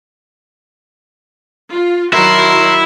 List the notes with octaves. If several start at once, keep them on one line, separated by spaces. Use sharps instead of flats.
F4
D#3 F#3 E4 F#4 A#4 C6